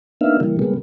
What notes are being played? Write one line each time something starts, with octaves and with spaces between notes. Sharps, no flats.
A#3 B3 D4 D#4 E5 F5
C#3 E3 G3 A#3
C#3 G3 G#3 A#3 B3